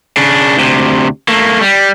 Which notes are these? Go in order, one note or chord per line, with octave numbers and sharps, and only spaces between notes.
C#3 D4
D2 C3
A3 A#3
G3